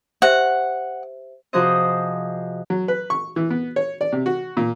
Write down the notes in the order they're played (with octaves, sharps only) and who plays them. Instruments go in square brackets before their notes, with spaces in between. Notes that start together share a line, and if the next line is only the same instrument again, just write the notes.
[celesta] G4 C5 E5 [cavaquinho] F#5
[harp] C3 F3 F#4 G#4 C5 D#5
[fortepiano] F#3
B4
C#6
E3
B3
C#5
D5
C3
F#4
A#2